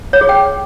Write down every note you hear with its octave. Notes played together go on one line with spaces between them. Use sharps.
C#5
G#4
G5